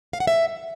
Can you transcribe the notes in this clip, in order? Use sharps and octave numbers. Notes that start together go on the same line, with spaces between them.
F5
F#5
E5